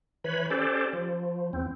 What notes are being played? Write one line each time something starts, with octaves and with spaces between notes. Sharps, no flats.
E3 B4 C#5 B5
C#4 G4 A4 C5 D5
F3
E2 C4